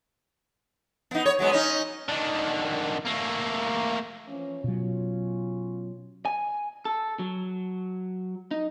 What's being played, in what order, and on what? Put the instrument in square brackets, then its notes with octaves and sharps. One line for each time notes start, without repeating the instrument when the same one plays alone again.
[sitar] B3 D#4
C#5
F#3 G#3 B3
C#4 D#4
[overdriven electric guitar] D3 D#3
A3 A#3
[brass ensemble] E3 F3 C#4
[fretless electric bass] B2 F#3 [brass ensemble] C#4 F4
[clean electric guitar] G#5
A4
F#3
D#4